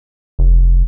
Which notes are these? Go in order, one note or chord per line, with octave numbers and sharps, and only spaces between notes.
F1